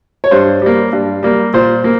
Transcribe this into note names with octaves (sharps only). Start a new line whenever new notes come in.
C#5
G2 C5
G3 A#3
G2
G3 A#3
A#2 C5
A#3